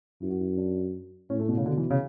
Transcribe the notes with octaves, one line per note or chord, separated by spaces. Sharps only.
F#2 E4
F#4
E4
D4
A2 C#4
A3
B2
C#3
B2 D3
E3
C#3